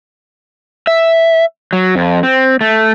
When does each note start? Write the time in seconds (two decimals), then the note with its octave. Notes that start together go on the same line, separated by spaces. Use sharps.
0.87 E5
1.73 F#3
1.96 F2
2.23 C4
2.61 A3